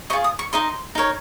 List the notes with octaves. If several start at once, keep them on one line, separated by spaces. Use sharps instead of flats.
F4 G#4 C5 D#5 C#6
D#6
C#6
D#4 A#4 D#5 C6
D#4 A#4 C#5